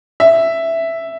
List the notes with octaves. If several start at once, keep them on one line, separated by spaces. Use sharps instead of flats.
E5